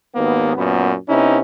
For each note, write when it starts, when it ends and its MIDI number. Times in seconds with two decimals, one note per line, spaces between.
0.15 0.53 32
0.15 0.53 39
0.15 0.53 58
0.15 0.53 59
0.56 0.93 42
0.56 0.93 46
0.56 0.93 59
1.09 1.40 48
1.09 1.40 59
1.09 1.40 61
1.09 1.40 63
1.09 1.40 64